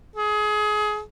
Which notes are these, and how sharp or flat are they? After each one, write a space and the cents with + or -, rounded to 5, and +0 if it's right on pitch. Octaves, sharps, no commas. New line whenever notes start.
G#4 +25